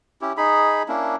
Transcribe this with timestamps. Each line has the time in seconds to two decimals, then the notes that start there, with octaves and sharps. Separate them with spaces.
0.21 C#4 E4 G4
0.37 D#4 G#4 B5
0.88 A#3 C#4 D4 E4